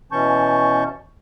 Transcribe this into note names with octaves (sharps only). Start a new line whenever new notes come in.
B2 E3 C#4 A5 C#6 G6